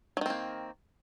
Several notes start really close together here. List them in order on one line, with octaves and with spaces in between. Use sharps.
F#3 D#3 C4 A#3